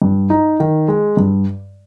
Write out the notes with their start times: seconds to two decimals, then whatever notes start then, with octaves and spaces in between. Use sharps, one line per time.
0.02 G2
0.30 D#4
0.60 D#3
0.88 G#3
1.17 G2